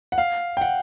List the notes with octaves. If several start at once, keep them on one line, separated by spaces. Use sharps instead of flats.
F#5
F5
G5
F#5